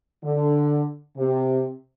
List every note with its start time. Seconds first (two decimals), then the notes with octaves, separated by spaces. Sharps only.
0.23 D3
1.17 C3